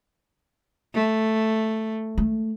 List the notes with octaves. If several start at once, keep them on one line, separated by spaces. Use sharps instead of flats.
A3
A3